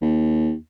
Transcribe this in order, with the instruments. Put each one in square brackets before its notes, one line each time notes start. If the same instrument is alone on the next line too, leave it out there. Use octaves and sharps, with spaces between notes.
[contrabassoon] D#2